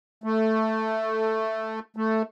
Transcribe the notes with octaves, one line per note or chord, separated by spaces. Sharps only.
A3
A3